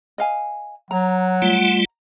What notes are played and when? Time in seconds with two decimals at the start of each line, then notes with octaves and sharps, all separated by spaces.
0.18 D#5 F5 G#5
0.91 F#3 F#5 A#5
1.42 G3 A3 F4